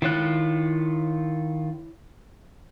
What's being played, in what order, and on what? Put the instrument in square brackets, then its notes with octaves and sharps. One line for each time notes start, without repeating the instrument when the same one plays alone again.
[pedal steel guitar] D#3 F4 F#6 [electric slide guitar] E4 C#5